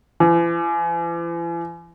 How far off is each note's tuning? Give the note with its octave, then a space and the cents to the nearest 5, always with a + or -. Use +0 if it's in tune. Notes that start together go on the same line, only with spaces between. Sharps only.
E3 +45